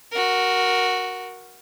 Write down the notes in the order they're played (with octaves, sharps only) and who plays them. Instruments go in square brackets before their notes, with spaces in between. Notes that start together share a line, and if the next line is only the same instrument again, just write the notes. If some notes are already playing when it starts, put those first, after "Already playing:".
[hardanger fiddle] F#4 A#4